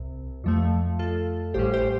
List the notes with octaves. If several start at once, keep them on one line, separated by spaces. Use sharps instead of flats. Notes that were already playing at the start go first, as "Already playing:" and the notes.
Already playing: C2 C3
F2 F3 A3
F4 A4
A1 A2 G3 G4 C5
G4 C5